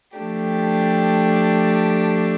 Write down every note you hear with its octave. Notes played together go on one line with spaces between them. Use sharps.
F3 A3 D4 G4